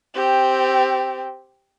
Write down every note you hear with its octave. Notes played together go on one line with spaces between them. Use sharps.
C4 G4